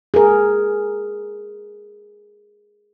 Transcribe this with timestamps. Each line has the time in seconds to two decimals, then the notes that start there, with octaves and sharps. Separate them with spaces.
0.14 G#4 A#4